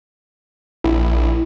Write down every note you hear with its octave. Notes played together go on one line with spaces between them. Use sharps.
A#1 E4